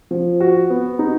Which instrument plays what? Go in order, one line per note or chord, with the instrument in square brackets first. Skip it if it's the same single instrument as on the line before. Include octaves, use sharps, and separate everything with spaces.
[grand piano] F3
F#4
B3
D#4